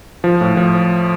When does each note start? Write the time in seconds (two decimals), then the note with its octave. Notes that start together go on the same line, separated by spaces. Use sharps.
0.24 F3
0.41 A2
0.57 F3